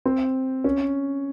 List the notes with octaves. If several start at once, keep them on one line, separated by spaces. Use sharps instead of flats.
C4
C#4